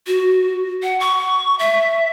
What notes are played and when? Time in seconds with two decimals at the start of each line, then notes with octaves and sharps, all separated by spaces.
0.07 F#4
0.83 F#5
1.00 C#6
1.59 E5